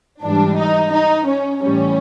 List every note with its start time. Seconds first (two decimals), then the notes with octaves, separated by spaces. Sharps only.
0.23 G#2 E3 G3 D4
0.58 D#4
0.92 D#4
1.27 C#4
1.62 A2 E3 G3 C#4